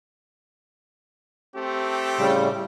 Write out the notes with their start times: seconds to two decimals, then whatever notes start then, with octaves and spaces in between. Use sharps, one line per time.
1.56 A3 C4 G4
2.19 A2 C#3 G3